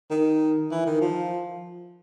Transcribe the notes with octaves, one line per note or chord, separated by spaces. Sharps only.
D#3
E3
D#3
F3